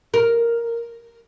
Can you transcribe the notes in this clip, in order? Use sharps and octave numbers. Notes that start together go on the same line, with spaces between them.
A#4